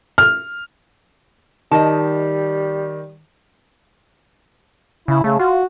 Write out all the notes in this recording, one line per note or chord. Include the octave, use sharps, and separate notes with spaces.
F6
D#3 G3 D#5 A5
C#3 E4
C#3 A3
F4 F#4